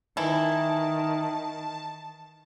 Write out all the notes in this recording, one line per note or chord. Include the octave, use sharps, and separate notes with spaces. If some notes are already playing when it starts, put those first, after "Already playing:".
D#3 E3 E4 A5